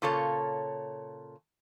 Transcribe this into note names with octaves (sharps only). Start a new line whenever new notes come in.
A#2 C#3 A4 C#5